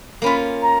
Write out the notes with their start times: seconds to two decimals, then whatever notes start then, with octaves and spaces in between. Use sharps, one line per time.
0.22 A#3 C#4 F4 B5
0.62 A#5